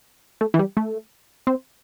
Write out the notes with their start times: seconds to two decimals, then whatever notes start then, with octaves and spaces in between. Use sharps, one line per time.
0.41 A3
0.54 E3
0.59 G3
0.77 A3
1.47 C4